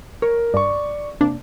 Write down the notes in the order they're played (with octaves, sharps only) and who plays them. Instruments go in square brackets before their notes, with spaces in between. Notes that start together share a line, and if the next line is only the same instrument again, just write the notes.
[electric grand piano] A#4 [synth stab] C#5
[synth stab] G2 [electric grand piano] D5 C#6
[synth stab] C3 A#3 D4